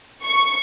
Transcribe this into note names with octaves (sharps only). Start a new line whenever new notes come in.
C#6